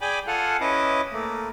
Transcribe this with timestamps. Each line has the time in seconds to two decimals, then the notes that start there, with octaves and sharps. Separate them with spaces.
0.01 G#4 D5 G5 G#5 B5 D6
0.27 F4 A4 F5 F#5 G#5
0.61 C#4 E4 B4 D#5 D6 D#6
1.13 A3 A#3